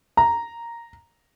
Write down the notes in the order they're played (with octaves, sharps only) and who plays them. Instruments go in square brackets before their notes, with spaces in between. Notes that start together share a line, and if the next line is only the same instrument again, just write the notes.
[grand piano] A#5